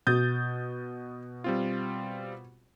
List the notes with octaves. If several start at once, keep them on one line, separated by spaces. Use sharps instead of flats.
B2 D#6 G6 A6
G3 C4 F4